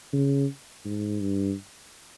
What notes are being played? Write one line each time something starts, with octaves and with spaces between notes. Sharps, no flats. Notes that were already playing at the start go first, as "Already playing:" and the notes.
C#3
G#2
G2